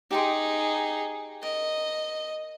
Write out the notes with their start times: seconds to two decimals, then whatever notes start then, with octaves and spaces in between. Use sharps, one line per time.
0.11 D#4 G4 G#4 G5 C6
1.43 A#4 D#5